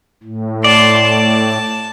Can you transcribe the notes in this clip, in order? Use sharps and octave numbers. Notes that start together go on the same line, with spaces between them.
A2
D5 A5 C6
A5